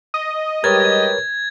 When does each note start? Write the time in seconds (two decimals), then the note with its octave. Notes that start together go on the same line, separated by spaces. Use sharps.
0.14 D#5
0.64 G3 G#3 G4 A#4 B4 C#5 G#6 A6